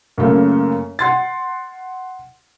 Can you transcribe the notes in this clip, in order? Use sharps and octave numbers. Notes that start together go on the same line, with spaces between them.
F#2 C#3 A3 A#3
F#5 C6 A6